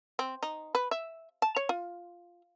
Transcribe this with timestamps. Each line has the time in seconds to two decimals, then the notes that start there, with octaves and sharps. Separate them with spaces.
0.19 C4
0.43 D#4
0.75 B4
0.91 E5
1.42 A5
1.56 C#5
1.69 F4